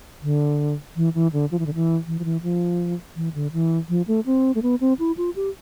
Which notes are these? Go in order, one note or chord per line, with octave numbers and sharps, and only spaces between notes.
D3
E3
E3
D3
F3
E3
D3
E3
E3
F3
E3
F3
E3
D3
E3
F3
A3
C4
A3
B3
C4
E4
F4
G4